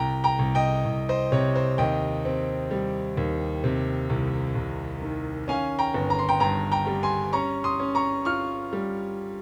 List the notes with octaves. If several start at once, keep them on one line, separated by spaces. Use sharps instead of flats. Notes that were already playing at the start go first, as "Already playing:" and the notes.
Already playing: C2 G5 A#5
G5 A#5
C2
D#5 G5
C2
C5 D#5
C3 C#5
C5
D#2 D#5 G5
C4
G3
D#2
C3
C2
C2
D#3
C#4 F5 G#5
G5 A#5
G1
A#5
C6
G5 A#5
G2 G5 A#5
G5 A#5
G3
G#5 C6
C#4 A#5 C#6
C6 D#6
C#4
A#5 C#6
F4 C#6 F6
G3